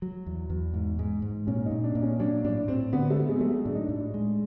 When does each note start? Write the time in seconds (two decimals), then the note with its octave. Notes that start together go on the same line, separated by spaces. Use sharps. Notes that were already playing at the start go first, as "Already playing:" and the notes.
0.02 F#3
0.26 E2
0.50 E2
0.74 G#2
0.99 G#2
1.22 G#2
1.47 A#2 C#4
1.66 D#4
1.71 A#2
1.84 D4
1.95 A#2
2.02 C#4
2.20 F#3 D4
2.44 A2 D4
2.68 A2 C4
2.93 D3 B3
3.10 A3
3.16 B3
3.29 G#3
3.41 F#3 A3
3.47 G#3
3.65 A2 D4
3.75 D#4
3.85 A2 D4
4.14 G#3